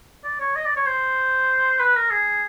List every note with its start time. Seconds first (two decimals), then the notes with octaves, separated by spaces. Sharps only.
0.24 D5
0.40 C#5
0.56 D#5
0.65 D5
0.76 C#5
0.86 C5
1.79 B4
1.96 A#4
2.11 G#4